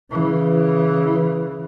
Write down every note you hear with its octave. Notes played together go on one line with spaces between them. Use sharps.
C#3 E3